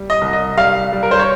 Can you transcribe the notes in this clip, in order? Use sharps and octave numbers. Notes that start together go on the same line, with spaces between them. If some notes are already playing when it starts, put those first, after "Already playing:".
Already playing: G3
D#5
C2
D#5
G3 F5
G3
A#4
C5
C#5